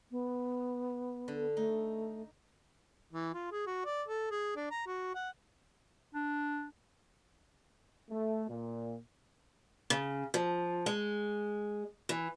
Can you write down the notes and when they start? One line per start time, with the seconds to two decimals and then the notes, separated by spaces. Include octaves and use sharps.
0.11 B3
1.28 D3
1.57 A3 D#4
3.13 E3
3.34 F4
3.52 G#4
3.66 F#4
3.85 D5
4.08 A4
4.31 G#4
4.56 D4
4.71 A#5
4.87 F#4
5.15 F#5
6.15 D4
8.10 A3
8.48 A#2
9.90 C#3
10.34 F3
10.86 G#3
12.09 E3